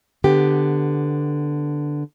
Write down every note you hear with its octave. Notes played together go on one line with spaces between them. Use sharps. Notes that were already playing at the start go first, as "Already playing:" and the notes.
D3 B3 G4